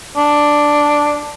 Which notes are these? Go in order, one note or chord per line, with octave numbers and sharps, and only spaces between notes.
D4